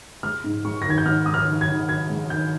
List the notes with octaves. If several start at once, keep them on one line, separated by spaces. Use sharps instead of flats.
G#3 F6
G#2
G#3 C#6
A#6
D#3 G#6
G6
G#2 F6
G#2 D#6
F6
D#3
G#6
D#3
D#3 G#6
G#3
D#3 G6